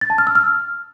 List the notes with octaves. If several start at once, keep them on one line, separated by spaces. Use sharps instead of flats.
A6
A5
F6
E6
F6